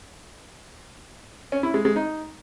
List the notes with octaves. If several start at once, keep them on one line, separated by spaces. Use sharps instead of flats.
C#4
E4
G#3
G#3
D#4